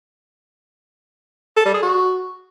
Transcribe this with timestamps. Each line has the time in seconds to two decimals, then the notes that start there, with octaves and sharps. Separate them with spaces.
1.57 A4
1.65 G3
1.74 G#4
1.83 F#4